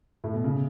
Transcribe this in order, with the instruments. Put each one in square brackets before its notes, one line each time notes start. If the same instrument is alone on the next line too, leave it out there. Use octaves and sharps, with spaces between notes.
[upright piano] A2
B2
C#3